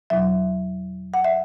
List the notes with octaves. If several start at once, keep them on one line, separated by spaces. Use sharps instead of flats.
E2 B2 F#3 E5
F#5
E5